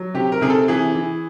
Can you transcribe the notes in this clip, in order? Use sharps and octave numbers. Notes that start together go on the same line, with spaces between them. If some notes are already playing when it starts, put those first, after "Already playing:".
Already playing: F#3
C3 G4
A#4
C3 G#4
A4
E3 G#4
E3